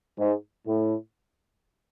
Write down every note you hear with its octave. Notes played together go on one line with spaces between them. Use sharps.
G#2
A2